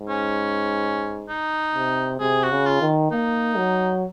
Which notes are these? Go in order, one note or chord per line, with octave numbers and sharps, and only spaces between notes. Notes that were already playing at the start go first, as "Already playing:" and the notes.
Already playing: G#2
C#4
D#4
C3
C3 G#4
F#4
C#3
F4
D#3
A#3 D#4
F#3